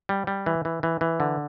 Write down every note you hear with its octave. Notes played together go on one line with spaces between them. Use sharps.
G3
G3
E3
E3
E3
E3
D3